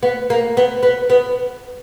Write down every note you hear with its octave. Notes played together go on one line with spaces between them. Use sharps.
B3
A#3
B3
B3
B3